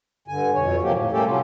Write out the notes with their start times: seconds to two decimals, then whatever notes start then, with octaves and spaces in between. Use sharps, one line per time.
0.28 G2 D3 G#5
0.54 F2 B2 C#5
0.82 C3 F3 F#3 A#3 G4
0.94 A2
1.12 G3 A3 A#3 C#4 G4 A4
1.25 C3 F3 F#3 C#4 F4